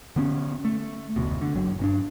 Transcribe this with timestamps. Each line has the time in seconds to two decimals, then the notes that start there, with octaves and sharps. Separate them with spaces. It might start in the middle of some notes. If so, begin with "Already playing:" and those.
0.16 D3 B3 C#4
0.65 A3
1.16 F1 D2 B2
1.41 D3
1.56 F#1 F#3
1.79 G2 C4 D4